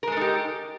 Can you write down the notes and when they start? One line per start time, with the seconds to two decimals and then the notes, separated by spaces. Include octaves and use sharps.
0.03 A#4
0.07 G#3
0.12 A4
0.17 D#4
0.21 G4